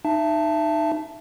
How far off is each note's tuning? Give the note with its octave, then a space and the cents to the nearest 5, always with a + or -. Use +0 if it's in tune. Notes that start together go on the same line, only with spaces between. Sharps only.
D#4 -20 E5 +25 A5 +0